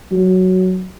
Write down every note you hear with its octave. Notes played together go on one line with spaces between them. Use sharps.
F#3